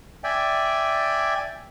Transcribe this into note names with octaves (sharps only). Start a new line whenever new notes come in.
D5 E5 G5 G#5